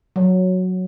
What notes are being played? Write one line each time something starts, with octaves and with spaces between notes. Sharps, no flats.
F#3